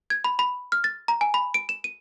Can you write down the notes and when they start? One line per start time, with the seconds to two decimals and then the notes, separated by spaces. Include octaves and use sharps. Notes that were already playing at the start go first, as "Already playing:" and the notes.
0.10 G#6
0.24 B5
0.39 B5
0.72 F6
0.84 A6
1.08 A#5
1.21 G#5
1.34 B5
1.54 D7
1.69 E7
1.84 D#7